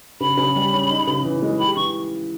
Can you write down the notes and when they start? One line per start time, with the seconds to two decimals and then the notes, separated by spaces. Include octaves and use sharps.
0.21 C#3 B5
0.37 C#3
0.56 G3
0.73 C#4
0.89 D#4
1.07 C#3
1.24 E3
1.42 G#3
1.59 G4 B5
1.76 E3 C#6